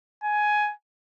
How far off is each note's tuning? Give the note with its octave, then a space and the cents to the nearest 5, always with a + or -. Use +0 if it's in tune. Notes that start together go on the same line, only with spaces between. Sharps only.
G#5 +10